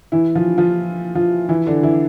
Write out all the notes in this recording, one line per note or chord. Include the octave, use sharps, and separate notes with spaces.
E3 E4
F3 F4
F3 F4
F3 F4
E3 E4
D3 D4
E3 E4